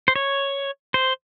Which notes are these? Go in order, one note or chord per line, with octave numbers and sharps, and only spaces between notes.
C5
C#5
C5